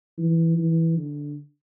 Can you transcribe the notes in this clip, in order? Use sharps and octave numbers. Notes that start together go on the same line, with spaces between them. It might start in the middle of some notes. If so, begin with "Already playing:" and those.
E3
E3
D3